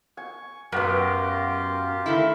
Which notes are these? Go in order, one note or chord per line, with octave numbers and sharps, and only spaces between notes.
G#5 C#6
F#2 B3 F4 G4 A#4 F#5
D#3 A3 E4